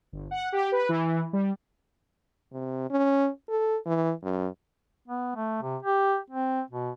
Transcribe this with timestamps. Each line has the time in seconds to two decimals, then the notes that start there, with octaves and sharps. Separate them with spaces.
0.13 G1
0.31 F#5
0.52 G4
0.72 B4
0.89 E3
1.33 G3
2.52 C3
2.90 C#4
3.49 A4
3.86 E3
4.23 F#2
5.08 B3
5.36 A3
5.62 C3
5.83 G4
6.30 C4
6.70 B2